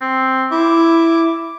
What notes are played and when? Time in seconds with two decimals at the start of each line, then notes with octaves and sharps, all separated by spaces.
0.01 C4
0.51 E4 D6